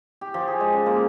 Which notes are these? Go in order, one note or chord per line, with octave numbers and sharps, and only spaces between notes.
G4
F3
G#4
G#3
C#4
A#3